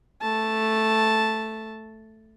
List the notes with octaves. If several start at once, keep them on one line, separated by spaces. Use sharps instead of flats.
A3 A5